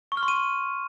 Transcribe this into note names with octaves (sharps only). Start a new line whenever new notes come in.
C#6
F6
C6
D#7